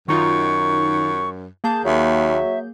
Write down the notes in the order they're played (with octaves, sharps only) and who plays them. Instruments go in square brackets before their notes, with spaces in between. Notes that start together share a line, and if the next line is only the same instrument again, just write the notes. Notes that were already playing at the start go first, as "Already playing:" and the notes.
[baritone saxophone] F#2 [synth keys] D#3 D#4 F4 [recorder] C#6
[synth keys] A#3 G#4 G6 [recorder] A5
[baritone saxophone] D#2 [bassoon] F#3 [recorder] E5